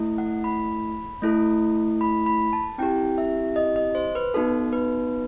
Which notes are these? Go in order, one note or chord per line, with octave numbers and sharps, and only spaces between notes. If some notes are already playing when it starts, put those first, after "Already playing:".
Already playing: A3 E4 A4
F#5
B5
A3 E4 A4
B5
B5
A5
C4 E4 G4 G5
E5
D#5
D#5
C5
B4
B3 D#4 F#4 A4
B4